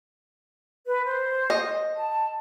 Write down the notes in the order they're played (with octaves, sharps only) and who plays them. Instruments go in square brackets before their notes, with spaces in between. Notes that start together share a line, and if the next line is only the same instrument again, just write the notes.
[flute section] B4
C5
[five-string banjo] D#5
[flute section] A5